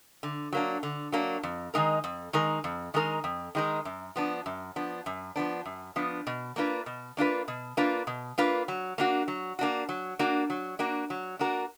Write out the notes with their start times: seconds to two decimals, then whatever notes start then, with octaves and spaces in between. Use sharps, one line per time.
0.23 D3
0.53 F#3 A#3 D4
0.83 D3
1.12 F#3 A#3 D4
1.43 F2
1.74 D#3 G#3 D#4 A#4
2.04 F2
2.33 D#3 G#3 D#4 A#4
2.64 F2
2.94 D#3 G#3 D#4 A#4
3.24 F2
3.55 D#3 G#3 D#4 A#4
3.85 F#2
4.16 F3 B3 D4
4.46 F#2
4.76 F3 B3 D4
5.06 F#2
5.36 F3 B3 D4
5.66 F#2
5.96 F3 B3 D4
6.27 B2
6.56 A#3 D4 F4 B4
6.86 B2
7.17 A#3 D4 F4 B4
7.48 B2
7.77 A#3 D4 F4 B4
8.07 B2
8.38 A#3 D4 F4 B4
8.68 F#3
8.98 A#3 D4 F#4
9.28 F#3
9.59 A#3 D4 F#4
9.89 F#3
10.19 A#3 D4 F#4
10.50 F#3
10.79 A#3 D4 F#4
11.10 F#3
11.39 A#3 D4 F#4 A#4